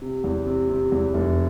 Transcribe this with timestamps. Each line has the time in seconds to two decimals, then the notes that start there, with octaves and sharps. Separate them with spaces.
0.02 C3
0.24 E2
0.46 C3
0.69 C3
0.92 E2
1.14 F1